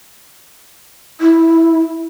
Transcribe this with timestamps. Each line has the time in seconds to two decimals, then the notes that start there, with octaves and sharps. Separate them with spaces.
1.21 E4